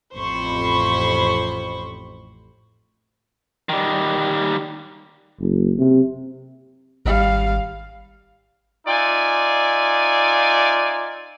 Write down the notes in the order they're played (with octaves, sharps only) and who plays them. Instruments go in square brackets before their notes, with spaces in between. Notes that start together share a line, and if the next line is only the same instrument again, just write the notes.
[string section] A1 F2 C5 B5 C#6
[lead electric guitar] D#3 G3
[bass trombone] F#1
C3
[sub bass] G#1 [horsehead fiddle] G3 F5
[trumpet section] D#4 F4 D5 E5 G#5